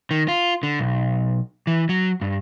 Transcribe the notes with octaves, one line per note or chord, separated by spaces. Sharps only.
D#3
F4
D3
B1
E3
F#3
G2